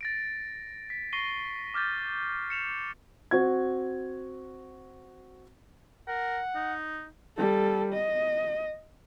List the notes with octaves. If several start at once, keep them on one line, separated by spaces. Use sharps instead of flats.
A6 A#6 D7
B6
C#6 A#6 C7 D#7 G7
D6 F6 G6 A6
C#7 E7 F7
C4 F#4 G#6
A#4 F#5
D#4
G3 A4
D#5